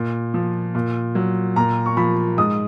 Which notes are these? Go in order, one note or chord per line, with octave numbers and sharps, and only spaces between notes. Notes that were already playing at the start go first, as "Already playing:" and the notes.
Already playing: A#2
F3
A#2
F#3
A#2 A#5
C#6
F3 B5
G#2 D#6